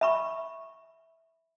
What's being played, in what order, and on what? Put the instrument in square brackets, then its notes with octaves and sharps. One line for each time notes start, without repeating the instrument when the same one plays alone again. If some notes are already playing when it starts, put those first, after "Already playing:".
[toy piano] E5 B5 C#6